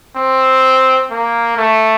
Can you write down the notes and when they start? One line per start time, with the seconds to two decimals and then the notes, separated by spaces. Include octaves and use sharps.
0.16 C4
1.11 A#3
1.58 A3